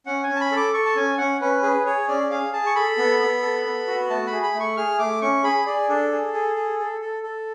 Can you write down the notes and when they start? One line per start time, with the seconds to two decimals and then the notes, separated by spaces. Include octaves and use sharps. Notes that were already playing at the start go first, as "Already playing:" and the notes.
0.06 C#4 F#5
0.23 C#4 G#5
0.36 A5
0.41 B5
0.51 A4
0.57 D6
0.73 A4 C#6
0.86 A5
0.96 C#4 G#5
1.18 C#4 F#5
1.41 C#4 B4
1.63 G#4 B4
1.86 G#4 C#5
2.08 C#4 D5
2.30 G#4 F5
2.53 G#4 A5
2.66 C#6
2.75 A4 B5
2.98 B3
3.20 B3
3.42 A4
3.65 B3
3.87 F#4
4.10 A3 A5
4.27 B5
4.32 G#4
4.43 B5
4.54 A3
4.60 C#6
4.77 G#4 F6
4.99 A3 D6
5.22 C#4 C#6
5.44 G#4 B5
5.66 G#4 D5
5.89 D4 A4
6.11 G#4
6.33 G#4
6.56 G#4
6.79 A4
7.01 A4
7.23 A4